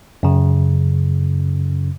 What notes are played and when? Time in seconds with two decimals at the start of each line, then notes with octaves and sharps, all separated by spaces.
0.23 F#2 C#3